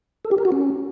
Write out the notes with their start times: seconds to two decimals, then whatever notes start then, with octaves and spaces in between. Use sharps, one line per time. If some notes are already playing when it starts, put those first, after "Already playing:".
0.25 A4
0.31 G4
0.38 A#4
0.45 F#4
0.52 C#4